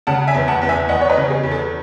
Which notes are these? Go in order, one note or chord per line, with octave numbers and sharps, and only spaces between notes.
C#3 F#5 A5
E5 G#5
E2
F#5 A5
E2
E5 G#5
E2 D#5 F#5
C#5
B4 D#5
C#3
G#4
E2
A4